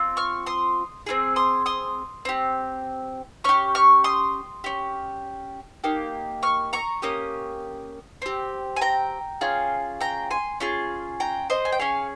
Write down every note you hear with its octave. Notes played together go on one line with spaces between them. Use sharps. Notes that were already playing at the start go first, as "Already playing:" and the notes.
Already playing: C4 F4
C#6 F6
C6 D#6
C4 F4 G#4
C6 D#6
C6 D#6
C4 G4
C#4 G4 C#6 F6
C#6 F6
C6 D#6
C#4 G4
A#3 D#4 G4
C#6 F6
A#5 C#6
A#3 C#4 G4 D#6
C4 G4
G#5
G5 A#5
C#4 F4 G#4
G5 A#5
G#5 C6
C#4 F4 G#4
G5 A#5
C5 D#5
G#5
G5
C#4 G#4 C#5 F5